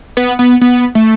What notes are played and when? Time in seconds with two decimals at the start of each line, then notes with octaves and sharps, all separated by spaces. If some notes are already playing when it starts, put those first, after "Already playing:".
0.17 B3
0.39 B3
0.61 B3
0.95 A3